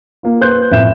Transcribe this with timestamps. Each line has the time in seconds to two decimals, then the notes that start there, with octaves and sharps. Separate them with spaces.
0.23 A#3 F4
0.41 B4 C5 C6 F#6 G6
0.71 F2 A2 E5 G6 E7